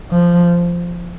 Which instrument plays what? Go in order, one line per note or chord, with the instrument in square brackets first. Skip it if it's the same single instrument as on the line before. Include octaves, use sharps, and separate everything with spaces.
[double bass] F3